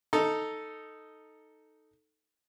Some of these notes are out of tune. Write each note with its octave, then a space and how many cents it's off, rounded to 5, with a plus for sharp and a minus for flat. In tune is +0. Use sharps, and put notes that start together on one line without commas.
D#4 +0 A4 +0 A#5 +0